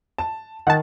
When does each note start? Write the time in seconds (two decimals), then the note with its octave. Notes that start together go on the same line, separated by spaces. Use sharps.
0.18 A5
0.67 D#3 F#5 A5